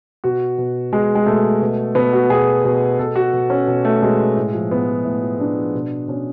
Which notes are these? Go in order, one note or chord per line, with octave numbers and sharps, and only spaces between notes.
B2 F#4
B2
B2 G#3
G#3
B2 A3
B2
B2 B3
F#4
B2 G#4
B2
B2 A4
F#4
B2
C#4
B2
A3
B2 G#3
A2
F3
A2 B3
F3
A2
F3
A2 D4
F3
B2
B2 C#4